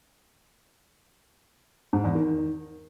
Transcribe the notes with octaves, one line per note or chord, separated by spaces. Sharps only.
G#2
E2
D#3